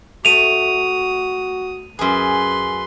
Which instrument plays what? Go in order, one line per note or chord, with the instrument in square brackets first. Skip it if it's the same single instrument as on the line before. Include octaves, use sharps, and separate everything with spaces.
[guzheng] A3 [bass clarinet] F#4 [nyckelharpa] D#6 [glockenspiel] D#7 F7
[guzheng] F#2 G#4 [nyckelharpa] B4 C6